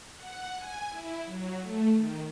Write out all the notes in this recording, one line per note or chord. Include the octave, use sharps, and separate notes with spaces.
F#5
G#5
E4
F#3
A3
D#3